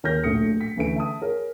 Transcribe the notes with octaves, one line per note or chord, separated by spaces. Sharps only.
D#2 A#4 C#5 F6 G6 A#6
D1 A#1 A3 D#6 C#7
B6
D2 E3 A3 C#4 D7
E5 A5 D#6
G#4 A#4 C#5